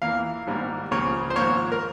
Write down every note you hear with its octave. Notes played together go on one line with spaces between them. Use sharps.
E2 E3 A#3 F5
G#1 G#2 G3 A#3
C#2 C#3 F3 A#3 C#5
C5
G#1 G#2 F3 A#3 C#5
A#4